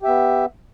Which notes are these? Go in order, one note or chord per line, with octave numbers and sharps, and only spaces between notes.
B3 G4 E5